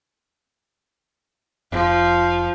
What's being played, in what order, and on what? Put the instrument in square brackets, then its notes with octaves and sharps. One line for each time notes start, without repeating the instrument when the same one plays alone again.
[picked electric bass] F1 [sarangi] F3